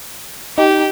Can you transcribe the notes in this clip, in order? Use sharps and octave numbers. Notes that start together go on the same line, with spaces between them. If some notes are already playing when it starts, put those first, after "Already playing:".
D#4 G4